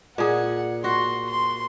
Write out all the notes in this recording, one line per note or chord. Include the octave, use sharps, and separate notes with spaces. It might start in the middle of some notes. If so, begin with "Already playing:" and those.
A#2 G#4 F#5
F#4 C6
C6